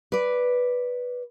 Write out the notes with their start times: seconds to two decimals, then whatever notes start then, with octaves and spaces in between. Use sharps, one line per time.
0.12 B4 D5